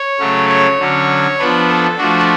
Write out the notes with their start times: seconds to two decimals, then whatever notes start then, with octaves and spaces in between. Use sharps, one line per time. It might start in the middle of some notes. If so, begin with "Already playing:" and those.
Already playing: C#5
0.19 C#3 F#3 A3 C#4
0.49 C#5
0.79 D3 F#3 C#4
1.39 F3 B3 D4 B4
1.69 A4
1.98 F3 A3 D4 F#4